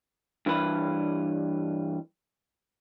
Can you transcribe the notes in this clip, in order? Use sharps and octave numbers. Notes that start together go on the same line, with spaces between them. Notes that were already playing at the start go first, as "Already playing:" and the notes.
G2 E3 B4